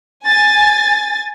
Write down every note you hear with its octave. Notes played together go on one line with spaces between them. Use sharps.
G#5 A6